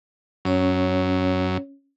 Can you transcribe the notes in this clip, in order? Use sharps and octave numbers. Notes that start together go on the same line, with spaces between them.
F#2 C#4 C#5